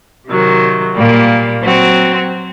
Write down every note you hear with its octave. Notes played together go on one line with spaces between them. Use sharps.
C3 D#3 F#3
A#2 G3 A#3
F#3 C4 F#4